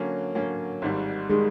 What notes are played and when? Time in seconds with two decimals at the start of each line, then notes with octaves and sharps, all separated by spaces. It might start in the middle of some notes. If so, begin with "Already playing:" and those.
Already playing: D3 F#3 A#3 C#4
0.35 D3 F#3 A#3 C#4
0.82 G#1 G#2 D#3 G3
1.29 D#3 G3 G#3